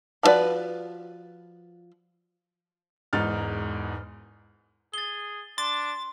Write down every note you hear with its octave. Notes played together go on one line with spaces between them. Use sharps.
F3 E4 F#4 B4 D5
E1 E2 G#2 D#4 F6 A6
G#4 A6 G7
D4 C6 A6